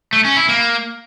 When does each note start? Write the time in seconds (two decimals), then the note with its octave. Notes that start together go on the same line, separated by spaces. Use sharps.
0.13 A3
0.25 C#4
0.36 E4
0.48 A#3